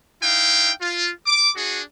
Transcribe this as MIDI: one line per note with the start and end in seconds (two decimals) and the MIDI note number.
0.22 0.72 63
0.22 0.72 64
0.22 0.72 77
0.22 0.72 79
0.81 1.11 65
1.26 1.50 86
1.56 1.81 62
1.56 1.81 66
1.56 1.81 68